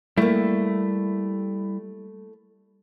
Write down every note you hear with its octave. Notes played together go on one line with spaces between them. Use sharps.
G3 A3 A#3 E4 E5